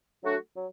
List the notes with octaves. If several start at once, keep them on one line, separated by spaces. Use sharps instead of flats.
F#3 A3 D4 F#4
F#3